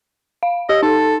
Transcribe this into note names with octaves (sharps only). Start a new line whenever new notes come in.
F5
G4 D#5
D#4 A4